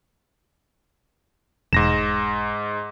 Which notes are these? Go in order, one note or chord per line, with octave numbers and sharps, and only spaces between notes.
E1 G#2 A#6 E7